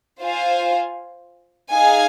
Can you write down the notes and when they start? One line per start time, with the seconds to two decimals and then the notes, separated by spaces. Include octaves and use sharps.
0.21 F4 C5 F5 G#5
1.71 D#4 G#4 F5 G#5